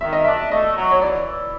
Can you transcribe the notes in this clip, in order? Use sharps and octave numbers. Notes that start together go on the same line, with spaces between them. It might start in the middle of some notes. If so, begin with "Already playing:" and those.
D#3 E5
D#5
D4 E5
A3 D#5
F#3
C#5
E3 D5
E3